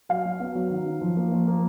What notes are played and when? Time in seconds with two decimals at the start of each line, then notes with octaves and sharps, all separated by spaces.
0.09 F#3 F5
0.25 F#3
0.40 B3
0.55 F#3
0.70 D#3
0.86 D#4
1.01 F3
1.16 A#3
1.32 F3
1.47 A#3